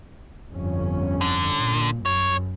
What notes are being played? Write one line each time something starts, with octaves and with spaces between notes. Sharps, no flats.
G1 F2 C#4
D3
A#2
F#2 C#5